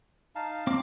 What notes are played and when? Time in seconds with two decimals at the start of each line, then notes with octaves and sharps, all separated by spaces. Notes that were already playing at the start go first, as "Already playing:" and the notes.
0.35 D#4 F5 A5
0.67 C4 D6